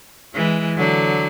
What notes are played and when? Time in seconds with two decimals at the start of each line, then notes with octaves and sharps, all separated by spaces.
0.34 E3 G#3
0.77 D3 F#3